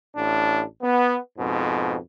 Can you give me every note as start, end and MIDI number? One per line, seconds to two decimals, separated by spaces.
0.15 0.63 33
0.15 0.63 45
0.15 0.63 62
0.83 1.18 59
1.38 1.97 41
1.38 1.97 44
1.38 1.97 47